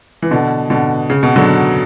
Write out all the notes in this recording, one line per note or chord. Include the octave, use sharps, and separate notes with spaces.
E3
B2 D3
B2 D3
C#3
B2
D3 F#3